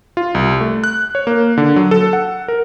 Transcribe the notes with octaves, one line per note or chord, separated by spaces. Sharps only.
F4
C2
A3
F#6
C#5
A#3
D3
F#3
A4
F#5
A#4